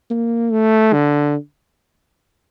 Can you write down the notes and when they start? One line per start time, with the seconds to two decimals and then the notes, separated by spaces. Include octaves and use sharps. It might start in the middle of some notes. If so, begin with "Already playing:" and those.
0.10 A#3
0.52 A3
0.93 D3